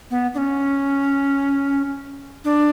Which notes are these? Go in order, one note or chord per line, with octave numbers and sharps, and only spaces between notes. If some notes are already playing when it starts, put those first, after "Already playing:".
B3
D4
C#4
D4